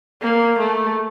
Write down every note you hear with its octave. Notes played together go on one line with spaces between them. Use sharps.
A#3
A3